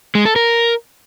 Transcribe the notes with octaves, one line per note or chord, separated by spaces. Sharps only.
G#3
A4
A#4